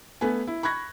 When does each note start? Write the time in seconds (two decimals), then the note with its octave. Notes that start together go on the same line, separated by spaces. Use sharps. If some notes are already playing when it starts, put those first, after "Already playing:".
0.21 A3 B3 B4 G#5
0.47 E4
0.63 B5 C#6 F#6 G#6 A#6